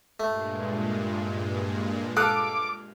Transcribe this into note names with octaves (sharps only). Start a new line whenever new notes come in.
G2 A#2 G#3 A3
A4 F5 D6 D#6 F#6